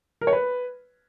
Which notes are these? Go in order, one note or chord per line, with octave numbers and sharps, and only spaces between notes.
A#4
C#5
B4